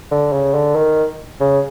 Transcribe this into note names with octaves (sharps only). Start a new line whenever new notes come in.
D3
C#3
D3
D#3
C#3